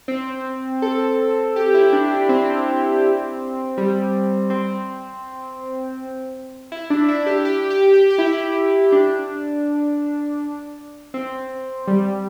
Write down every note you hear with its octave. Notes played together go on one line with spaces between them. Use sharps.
C4
A4
G4
E4
D4
D4
C4
G3
C4
E4
D4
E4
G4
G4
G4
G4
G4
E4
D4
C4
G3